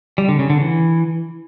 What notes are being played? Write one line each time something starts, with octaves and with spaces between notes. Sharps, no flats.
G3
D3
C#3
D3
E3